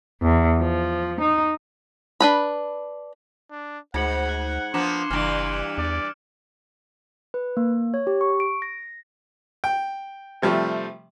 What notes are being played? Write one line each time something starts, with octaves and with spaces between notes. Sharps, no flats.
E2
F3
D#4
D4 B4 B5
D4
D2 G#2 F#5 G#6 C#7 F#7
F#6
F3 A#3 B3 D4 C6 D6 E7
F#1 G2 E3 F6 D7
E2 D5
B4
A#3
C#5
G4
C#6
D7
A#6
G5
C3 F3 G3 A3